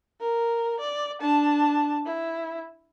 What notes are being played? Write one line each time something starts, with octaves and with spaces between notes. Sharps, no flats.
A#4
D5
D4 A5
E4